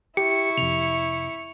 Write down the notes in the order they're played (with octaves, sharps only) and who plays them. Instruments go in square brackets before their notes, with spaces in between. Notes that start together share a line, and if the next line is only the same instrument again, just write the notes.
[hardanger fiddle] E4 C#6 [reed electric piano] G4 [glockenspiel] C#7
[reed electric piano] F2 C3 [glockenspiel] F7